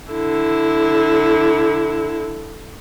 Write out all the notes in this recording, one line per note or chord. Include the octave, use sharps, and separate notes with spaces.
D3 E4